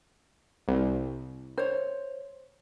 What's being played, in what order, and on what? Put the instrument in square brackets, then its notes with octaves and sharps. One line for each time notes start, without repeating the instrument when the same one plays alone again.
[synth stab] C2
[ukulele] C5 C#5